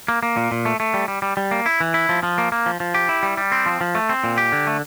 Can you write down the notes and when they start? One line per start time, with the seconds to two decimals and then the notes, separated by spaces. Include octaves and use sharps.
0.08 A#3
0.23 A#3
0.37 A#2
0.52 A#2
0.65 A3
0.80 A3
0.94 G3
1.08 G3
1.22 G3
1.37 G3
1.51 A#3
1.66 E4
1.80 E3
1.94 E4
2.09 F3
2.23 F3
2.38 A#3
2.52 A#3
2.66 F3
2.80 F3
2.94 G4
3.09 E4
3.23 G3
3.37 G3
3.52 C4
3.66 F3
3.81 F3
3.95 A3
4.09 C4
4.24 A#2
4.38 G4
4.52 D3
4.67 A3